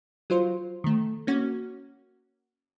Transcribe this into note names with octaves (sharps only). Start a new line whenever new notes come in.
F#3 F4 C5
D#3 A3
A#3 C#4 F#4